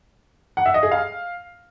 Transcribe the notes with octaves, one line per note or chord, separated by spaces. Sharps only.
F#5
E5
D#5
G#4
F5